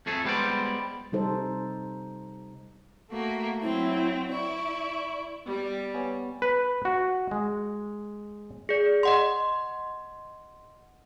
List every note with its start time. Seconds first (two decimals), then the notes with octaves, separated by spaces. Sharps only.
0.06 F2 A3 G#4 A4
0.25 G3 G#3 B3 B4 C5 D5
1.12 C3 G3 D#4 A4 C5
3.11 A3 A#3 F#4
3.62 F#3 C4 E4
4.29 E4 D5 C#6
5.46 G3 B3
5.94 B3 C#5 G#5
6.42 B4
6.85 F#4
7.31 G#3
8.69 G#4 D5
9.03 D#5 F#5 C6